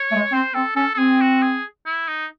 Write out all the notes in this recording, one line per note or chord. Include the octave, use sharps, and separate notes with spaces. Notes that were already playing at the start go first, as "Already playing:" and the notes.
Already playing: C#5
A3
G#3
C4 C5
C4 A4
C#4 A4
A4
C4 G#4
F#4
G#4
E4
D#4